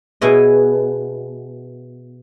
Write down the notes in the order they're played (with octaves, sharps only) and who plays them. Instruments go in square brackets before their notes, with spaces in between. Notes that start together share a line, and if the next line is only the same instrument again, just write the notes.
[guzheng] B2 E4 G#4 C#5 D#5